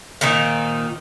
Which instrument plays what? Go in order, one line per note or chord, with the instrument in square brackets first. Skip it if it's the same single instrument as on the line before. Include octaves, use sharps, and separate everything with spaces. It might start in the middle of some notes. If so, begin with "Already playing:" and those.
[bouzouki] A#2 D#3 C4 D#4